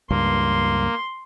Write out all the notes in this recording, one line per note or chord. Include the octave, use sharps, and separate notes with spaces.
C#2 G2 A#3 C6